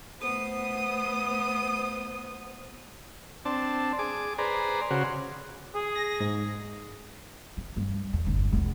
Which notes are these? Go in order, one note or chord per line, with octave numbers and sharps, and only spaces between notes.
A3 B3 C5 D#6
C4 D4 A5
G#4 D6
G#4 B4 C5 D5 A#5
C#3 F#4 C5
G#4
A#6
G#2
E3
G2
E2
G1 D3
E1 A#1